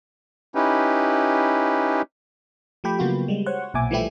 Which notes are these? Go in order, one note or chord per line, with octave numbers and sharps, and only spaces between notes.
C#4 D#4 E4 G4 B4
F3 A3 G4 G5 B5
C#3 F#3 A#3 B3 F4 F#4
G3 G#3
C5 C#5 F#5 C#6
B1 A#2 E5 G#5 D6
E3 F3 G3 A3 E4 G4